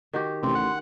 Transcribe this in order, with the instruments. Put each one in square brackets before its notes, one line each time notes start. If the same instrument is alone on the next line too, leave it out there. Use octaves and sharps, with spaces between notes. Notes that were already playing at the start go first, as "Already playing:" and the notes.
[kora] D#3 F#4 G4
[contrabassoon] A1 [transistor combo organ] C3 [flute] C6
[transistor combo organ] F#5